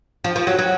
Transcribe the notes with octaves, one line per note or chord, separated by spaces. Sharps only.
F3
F3
F#3
F#3